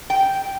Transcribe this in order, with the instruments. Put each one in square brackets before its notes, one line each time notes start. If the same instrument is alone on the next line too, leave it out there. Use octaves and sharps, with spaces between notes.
[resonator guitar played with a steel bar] G5